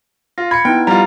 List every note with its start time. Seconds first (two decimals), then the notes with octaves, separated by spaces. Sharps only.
0.38 F4 A#6
0.51 B5 G#6 C#7
0.65 B3 D#4 E4 G5
0.87 G3 F4 A#5